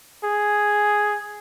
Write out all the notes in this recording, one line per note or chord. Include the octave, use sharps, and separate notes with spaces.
G#4